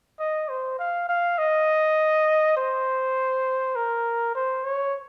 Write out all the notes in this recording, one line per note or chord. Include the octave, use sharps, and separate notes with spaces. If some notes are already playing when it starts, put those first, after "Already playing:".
D#5
C5
F5
F5
D#5
C5
A#4
C5
C#5